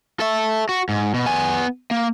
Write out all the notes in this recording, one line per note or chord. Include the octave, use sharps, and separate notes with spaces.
A4 E5
F#4
G#2
B2
B3 G#5
A#3